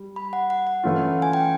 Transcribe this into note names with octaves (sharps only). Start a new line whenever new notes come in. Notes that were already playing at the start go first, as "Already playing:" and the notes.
Already playing: G3
B5
F#5
F#5
F#5
E3 A3 C#4 F4
G#5
G5